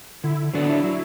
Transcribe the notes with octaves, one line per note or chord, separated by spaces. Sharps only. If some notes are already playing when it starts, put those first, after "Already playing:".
D3 E4
F#3 B3 D4 A4 D5
E4
F#3 E4